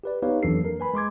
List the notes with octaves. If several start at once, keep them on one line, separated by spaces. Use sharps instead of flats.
G4 B4 D5
B3 D#4 G4 B4 C#5 F5
F2 E3 F#3 D4 A4 C7
A#3 A#4
B4 G#5 B5
G#3 C6 D6 G#6